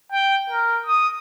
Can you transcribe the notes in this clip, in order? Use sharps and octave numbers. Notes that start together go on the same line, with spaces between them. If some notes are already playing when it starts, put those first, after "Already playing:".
G5
A#4
D#6